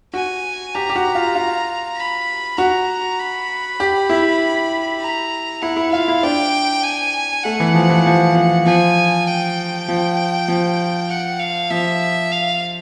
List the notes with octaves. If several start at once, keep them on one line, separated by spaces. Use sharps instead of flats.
F#4 G#5
G4 A#5
G4
F#4
F4
F4
B5
F#4 A#5
B5
G4
E4
A#5
E4 F#5
E4
F4 F5
E4
D4 G5
G#5
A3 F#5
E3
F3
E3
F3
F3
F3 G#5
G5
F3
F3
F#5
F5
F3 E5
F5